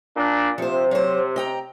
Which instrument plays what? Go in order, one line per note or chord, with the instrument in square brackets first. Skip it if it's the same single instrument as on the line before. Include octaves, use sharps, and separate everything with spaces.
[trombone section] A#2 D4
[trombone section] C3 [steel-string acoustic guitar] F3 C5
[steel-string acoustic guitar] F#3 C5
D#5 G5 A#5